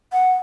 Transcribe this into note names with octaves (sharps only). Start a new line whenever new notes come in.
F#5